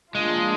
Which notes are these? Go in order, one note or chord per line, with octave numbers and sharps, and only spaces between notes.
F3 G#3 A#3 D4 F4